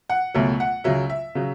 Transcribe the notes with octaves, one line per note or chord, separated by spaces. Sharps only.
F#5
C#2 B2 F#3 A3 E5
F#5
C#2 C#3 F#3 E5
E5
C#3 F#3